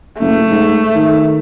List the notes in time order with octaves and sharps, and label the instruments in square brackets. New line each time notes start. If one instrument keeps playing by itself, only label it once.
[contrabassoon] F#1 [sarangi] A3
[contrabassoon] G#2
D#3